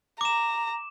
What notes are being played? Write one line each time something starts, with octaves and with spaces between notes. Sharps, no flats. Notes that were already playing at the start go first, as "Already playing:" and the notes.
A#5 D6 E7